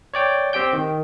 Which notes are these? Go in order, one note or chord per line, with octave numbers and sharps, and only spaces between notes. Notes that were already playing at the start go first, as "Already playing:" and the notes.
C#5 D5 G5
C4 G4 G5 G6
D#3